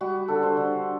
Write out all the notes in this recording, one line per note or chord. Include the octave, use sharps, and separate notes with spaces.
G3 F#4
D3 A4
C5
D3